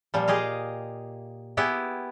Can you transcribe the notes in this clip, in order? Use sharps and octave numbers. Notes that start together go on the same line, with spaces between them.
A#2 F3 G3
G4 G#4 D#5 F5
B3 E4 G4 G#4